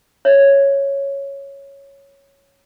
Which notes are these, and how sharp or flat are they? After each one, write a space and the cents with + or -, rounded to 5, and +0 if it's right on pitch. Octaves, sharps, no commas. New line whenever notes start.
C#5 +0 E5 +0